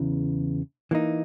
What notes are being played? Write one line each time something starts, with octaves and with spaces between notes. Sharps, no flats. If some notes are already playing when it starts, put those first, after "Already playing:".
Already playing: E2 C#3 E3
E3 A#3 D#4